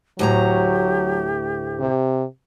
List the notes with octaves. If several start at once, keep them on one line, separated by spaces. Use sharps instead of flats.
D2 A2 F#3 G4 A#5
C3